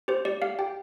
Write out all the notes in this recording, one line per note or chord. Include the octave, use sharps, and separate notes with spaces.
G4 C5
G4 D5
G4 F5
G4 G5